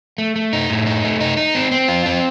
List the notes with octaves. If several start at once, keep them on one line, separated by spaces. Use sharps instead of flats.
A3
A3
D#4
A2
D#4
A3
D#4
D#4
C4
C4
F4
C4